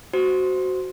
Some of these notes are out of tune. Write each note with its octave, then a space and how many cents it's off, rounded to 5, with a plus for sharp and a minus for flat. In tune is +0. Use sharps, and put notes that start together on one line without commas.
F#4 +10 C5 -15